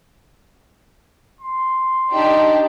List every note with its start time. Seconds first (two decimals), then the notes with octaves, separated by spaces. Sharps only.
1.41 C6
2.13 D4 D#4 G4